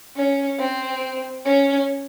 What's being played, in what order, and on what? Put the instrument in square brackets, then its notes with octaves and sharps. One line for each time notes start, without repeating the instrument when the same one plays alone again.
[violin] C#4
C4
C#4